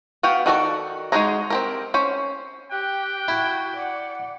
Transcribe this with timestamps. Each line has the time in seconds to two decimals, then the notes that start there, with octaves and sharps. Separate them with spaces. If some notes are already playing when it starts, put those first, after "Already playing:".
0.23 B3 F#4 F5 G5
0.46 D#3 F#4 A4 D5
1.12 G#3 D#4 F#4 G#4 A#5
1.50 C4 G4 A#4
1.94 C#4 C5
2.71 G4 G5 F#6
3.28 E4 F#4
3.76 D5 F#5